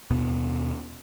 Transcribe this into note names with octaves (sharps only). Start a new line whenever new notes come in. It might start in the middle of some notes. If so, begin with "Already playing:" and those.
D#2 B2 B3